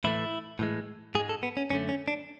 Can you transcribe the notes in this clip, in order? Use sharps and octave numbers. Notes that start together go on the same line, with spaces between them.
A2 E3 A3 E4
A2 E3 G#3
G#2 G#3 G#4
A4
B3
C#4
F#2 D3 A3 C#4
C#4
D4